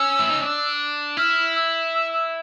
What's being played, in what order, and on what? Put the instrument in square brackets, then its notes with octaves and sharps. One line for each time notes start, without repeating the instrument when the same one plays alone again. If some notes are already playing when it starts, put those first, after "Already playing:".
Already playing: [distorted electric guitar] C#4 [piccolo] E6
[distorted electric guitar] E4
D#4
D4
[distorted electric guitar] E4 [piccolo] F6
[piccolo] E6
E6
E6